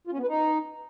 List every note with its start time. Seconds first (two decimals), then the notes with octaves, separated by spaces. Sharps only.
0.07 F4
0.13 C#4
0.18 B3
0.23 B4
0.28 D#4